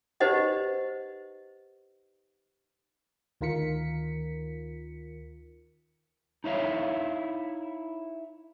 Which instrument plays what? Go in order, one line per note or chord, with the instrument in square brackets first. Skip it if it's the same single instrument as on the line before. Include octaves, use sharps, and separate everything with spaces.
[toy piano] D#4 G4 B4 C5 D#5 F#5
[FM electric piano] D2 D#3 F4 A#4 B6 C#7
[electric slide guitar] D#4 E4 C#5 F5